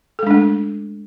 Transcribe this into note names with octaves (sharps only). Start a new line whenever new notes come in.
G#3 A3 D4 A4